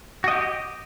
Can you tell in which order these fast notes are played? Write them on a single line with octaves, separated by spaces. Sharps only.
F#4 D#5 G4